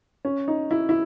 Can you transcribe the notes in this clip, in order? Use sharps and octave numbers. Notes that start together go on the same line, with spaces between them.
C#4
D#4
E4
E4